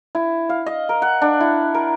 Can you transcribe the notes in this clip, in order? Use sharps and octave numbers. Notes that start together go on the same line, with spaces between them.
E4
F5
D#5
A#4
F#5
D4
E4
A#4